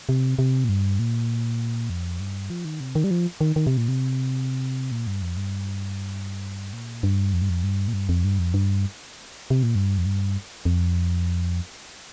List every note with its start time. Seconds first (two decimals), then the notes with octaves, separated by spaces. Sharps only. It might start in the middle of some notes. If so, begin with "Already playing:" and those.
0.09 C3
0.39 C3
0.64 A#2
0.69 G2
0.99 A#2
1.90 F2
2.20 G2
2.50 F3
2.65 D#3
2.80 C3
2.95 D#3
3.04 G3
3.11 F3
3.41 D#3
3.56 D#3
3.67 C3
3.77 A#2
3.88 C3
4.92 A#2
5.07 G2
5.22 F2
5.37 G2
6.73 A#2
7.03 G2
7.33 F2
7.42 G2
7.50 F2
7.64 G2
7.88 A#2
7.93 G2
8.09 F2
8.24 G2
8.39 F2
8.54 G2
9.50 C3
9.63 A#2
9.75 G2
9.98 F2
10.06 G2
10.65 F2